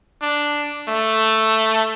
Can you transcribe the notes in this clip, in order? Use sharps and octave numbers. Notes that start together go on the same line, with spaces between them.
D4
A3